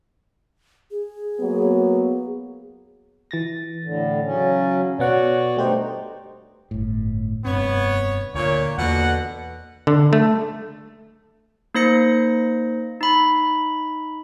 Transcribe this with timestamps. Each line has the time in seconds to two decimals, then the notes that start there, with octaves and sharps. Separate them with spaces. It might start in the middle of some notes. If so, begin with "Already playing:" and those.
0.91 G#4
1.39 F#3 A#3 B3
3.31 E3 A6 A#6
3.84 A2 D3
4.25 C#3 F#3 C#4
4.99 B2 B3 F#4 C#5 D5 F#5
5.57 G2 A3 D#4 G4 C5
6.71 G1 A2
7.45 F1 G2 B3 C4 C#5
8.34 D2 A#2 C#5
8.78 E2 B2 D3 A#3 F#5
9.87 D3
10.13 A3
11.74 A#3 D#4 C5 A#6 C#7
13.01 D#4 B5